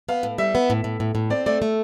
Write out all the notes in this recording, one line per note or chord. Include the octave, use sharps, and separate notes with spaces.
B3 F5
A2
G3 E5
B3
A2
A2
A2
A2
C4 D5
A3 D5
A3